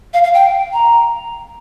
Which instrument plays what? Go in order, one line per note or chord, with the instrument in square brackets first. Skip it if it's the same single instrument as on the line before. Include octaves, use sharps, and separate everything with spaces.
[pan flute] F5
F5
G5
A#5